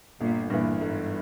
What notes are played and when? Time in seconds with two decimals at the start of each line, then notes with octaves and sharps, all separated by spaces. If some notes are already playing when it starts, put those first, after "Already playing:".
0.20 G1 A#2
0.50 G2 A#2 E3
0.80 G1 G#2